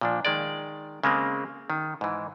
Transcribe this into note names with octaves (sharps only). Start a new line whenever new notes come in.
A#2 F3 D4
D#3 G#3 D5
C#3 G#3 A#3 C4
D#3
G#2 E3